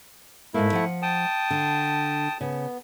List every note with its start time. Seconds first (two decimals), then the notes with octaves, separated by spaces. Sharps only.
0.54 G#2 A3 A#3 E4
0.73 F3 F#5
1.02 G5 A5 D#6
1.50 D3
2.41 C#3 B3